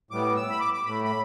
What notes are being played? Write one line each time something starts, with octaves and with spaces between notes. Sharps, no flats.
A2 G3 B3 D6
E6
B5
D6
D6
A2 A3 B5
B5